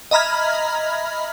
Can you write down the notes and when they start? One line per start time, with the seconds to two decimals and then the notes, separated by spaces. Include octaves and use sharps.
0.11 D#5 E5 A#5 B5 F6 G#6